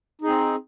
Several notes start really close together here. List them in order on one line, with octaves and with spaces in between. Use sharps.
D#4 G#4 C4